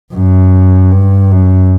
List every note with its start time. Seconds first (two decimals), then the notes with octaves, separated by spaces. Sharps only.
0.13 F#2
0.91 G2
1.31 F#2